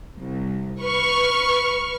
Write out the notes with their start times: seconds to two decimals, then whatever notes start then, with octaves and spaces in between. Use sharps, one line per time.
0.17 C2
0.80 B4 C#6 F6